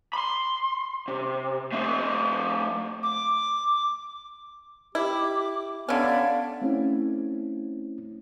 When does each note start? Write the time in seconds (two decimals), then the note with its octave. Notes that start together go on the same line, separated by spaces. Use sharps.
0.13 B5 C6
1.08 C3
1.72 A3 C4
3.03 D6
4.95 E4 G4 D6
5.89 D3 B3 C#4 D5 E5 F5 G#6
6.62 A3 C4 C#4 E4